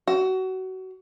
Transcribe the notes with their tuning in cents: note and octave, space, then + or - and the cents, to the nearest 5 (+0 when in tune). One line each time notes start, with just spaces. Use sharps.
F#4 +25